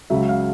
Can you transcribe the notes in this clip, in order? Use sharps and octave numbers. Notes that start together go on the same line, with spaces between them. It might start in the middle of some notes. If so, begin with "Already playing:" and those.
C#2 C#3 F#3 E5
F5